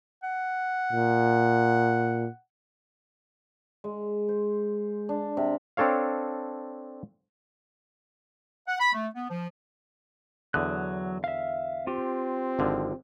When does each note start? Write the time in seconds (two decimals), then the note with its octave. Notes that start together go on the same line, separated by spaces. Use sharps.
0.23 F#5
0.93 A#2
3.84 G#3
4.29 C5
5.09 D4
5.37 C3
5.77 C4 D4 A4 C#5 F5
8.68 F#5
8.80 B5
8.93 A3
9.15 B3
9.30 F3
10.54 E2 D3 F#3 D#6 F#6
11.24 E5 F5
11.87 C4 F4 G4
12.59 G#1 D3 F3